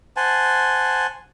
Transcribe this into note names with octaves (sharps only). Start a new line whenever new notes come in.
C5 F#5 G#5 A5